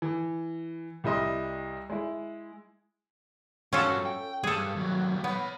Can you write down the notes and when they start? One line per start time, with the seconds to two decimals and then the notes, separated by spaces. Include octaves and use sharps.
0.02 E3
1.04 C2 G3 E4 D#5 C6
1.90 G#3 E4
3.73 G2 C#4 F4 F#4 A4
4.06 G5
4.44 G2 G#4 A4
4.76 D#2 F#3
5.24 B3 C#5 B5